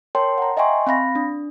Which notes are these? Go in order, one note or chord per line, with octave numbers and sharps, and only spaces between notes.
A#4 C#5 G5 A5 C6
F#5 A#5
D#5 E5 G5 G#5 C6 C#6
C4 F5 B5 A#6
D4